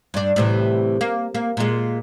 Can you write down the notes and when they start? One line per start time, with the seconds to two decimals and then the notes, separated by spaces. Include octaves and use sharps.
0.14 G2 D4
0.36 A2 C3 E3
1.01 A#3
1.35 A#3
1.57 A#2 G#3